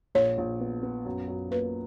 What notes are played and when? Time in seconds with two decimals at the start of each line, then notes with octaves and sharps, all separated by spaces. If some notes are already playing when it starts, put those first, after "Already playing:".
0.15 A#1 C#5
0.38 A#1
0.60 B3
0.83 B3
1.05 F#2
1.28 F#2
1.51 A#3 B4